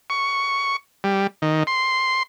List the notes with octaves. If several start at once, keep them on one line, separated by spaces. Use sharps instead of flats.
C#6
G3
D#3
C6